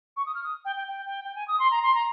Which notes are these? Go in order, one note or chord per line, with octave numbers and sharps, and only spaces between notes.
C#6
D#6
F6
D#6
G5
G5
G5
G5
G5
G#5
D#6
C6
A#5
C6
A#5